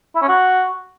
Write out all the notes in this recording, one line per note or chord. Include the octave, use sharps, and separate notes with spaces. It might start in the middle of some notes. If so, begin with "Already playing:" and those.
E4
C#4
F#4